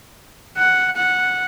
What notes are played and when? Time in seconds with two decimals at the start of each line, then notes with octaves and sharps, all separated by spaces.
0.57 F#5
0.96 F#5